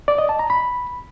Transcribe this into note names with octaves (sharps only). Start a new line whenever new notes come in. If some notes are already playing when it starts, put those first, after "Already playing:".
D5
D#5
A5
A#5
B5